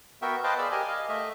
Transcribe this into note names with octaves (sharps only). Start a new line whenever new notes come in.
B3 F#4 A#4 E5 G5
B4 C5 D#5 F5 G5 A5
G#4 D5 B5 E6
G4 A#4 D#5 G#5
D#5 F5
A3 D#5 E5